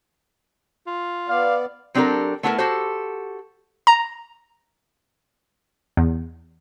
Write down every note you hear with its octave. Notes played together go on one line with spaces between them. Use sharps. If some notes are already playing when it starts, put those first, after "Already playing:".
F4
B3 D5 F5
F#3 C4 D4 G4 A4 A#4
A3 B3 E4 F4 A4 A#4
F#4 G4 A4 C5
A#5
E2